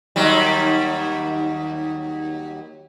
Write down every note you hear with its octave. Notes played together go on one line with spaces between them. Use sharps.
D#2 F#3 G3